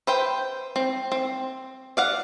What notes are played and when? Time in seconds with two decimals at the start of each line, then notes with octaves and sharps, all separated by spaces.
0.07 B4 C5 G5
0.76 C4
1.12 C4
1.97 D5 F5 F#5